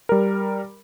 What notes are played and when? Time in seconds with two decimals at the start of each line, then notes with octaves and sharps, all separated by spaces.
0.09 G3 A#4